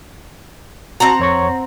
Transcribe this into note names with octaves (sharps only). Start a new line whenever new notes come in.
C4 F#4 F#5 A5 A#5
F2 C#5 C#6